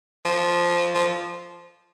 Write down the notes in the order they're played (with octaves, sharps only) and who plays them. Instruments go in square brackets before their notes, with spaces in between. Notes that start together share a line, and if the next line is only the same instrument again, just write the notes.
[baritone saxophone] F3
F3